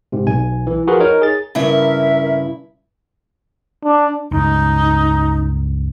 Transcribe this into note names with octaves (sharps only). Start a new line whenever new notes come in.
G#2 C3
B1 G#5
E3
F3 F4 F#4 G#4 A#4 B4
D#4 A#4 C#5
G#4 A6
G2 C#3 E4 A#4 E5
D4
C#2 G2 D#4